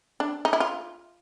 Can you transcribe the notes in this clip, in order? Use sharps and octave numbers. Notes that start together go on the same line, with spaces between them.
D4
D#4
E4
F4